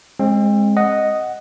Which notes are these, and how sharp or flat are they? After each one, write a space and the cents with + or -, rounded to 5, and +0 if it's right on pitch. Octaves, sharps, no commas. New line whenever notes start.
G#3 +0 C4 +35
D#5 +0 F#5 +0